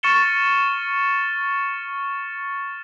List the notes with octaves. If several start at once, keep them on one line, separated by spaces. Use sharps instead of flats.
C#6 F6 A6 C#7 E7 G7